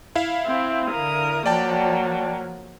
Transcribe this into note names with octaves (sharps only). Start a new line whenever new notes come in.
E4 E5 F5
C4
D3 A#4 D#6
F3 F#3 A#3 D5 G5 A5